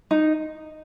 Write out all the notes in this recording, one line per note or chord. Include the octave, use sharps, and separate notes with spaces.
D#4